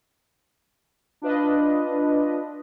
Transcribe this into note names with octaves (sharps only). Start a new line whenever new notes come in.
D4 F4 B4 D#5